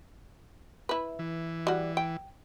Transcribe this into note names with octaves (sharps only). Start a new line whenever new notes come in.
E4 B4
E3
G3 F#4
G5